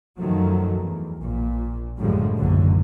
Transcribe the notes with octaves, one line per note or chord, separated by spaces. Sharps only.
F#2 D#3 F3 F#3 A3
E2
A#1 A#2
F#2 A2 D3 F3 G3 G#3
F#1 B1 A2 D3 E3 F#3